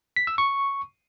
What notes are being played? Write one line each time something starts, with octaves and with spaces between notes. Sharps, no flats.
B6
E6
C#6